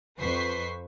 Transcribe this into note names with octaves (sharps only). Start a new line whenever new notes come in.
F2 B4 C5 C#6 B6 C7